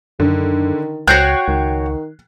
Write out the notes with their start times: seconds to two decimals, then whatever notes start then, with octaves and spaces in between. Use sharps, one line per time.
0.20 F#2 D3 D#3
1.08 C#2 F#4 C#5 G5 F#6 C7 F#7
1.48 C#2 D#3